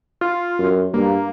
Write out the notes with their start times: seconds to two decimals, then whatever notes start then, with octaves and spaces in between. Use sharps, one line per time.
0.21 F4
0.59 F#2
0.94 G2 A#3